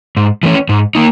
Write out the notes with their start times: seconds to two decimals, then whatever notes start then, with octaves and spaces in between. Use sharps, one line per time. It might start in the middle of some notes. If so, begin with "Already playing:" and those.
0.17 G#2
0.43 E3 A3 C#4
0.69 G#2
0.95 A#3 D#4